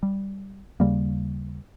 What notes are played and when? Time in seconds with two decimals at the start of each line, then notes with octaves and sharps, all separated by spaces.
0.03 G3
0.80 D#2 C#3 G3 A#3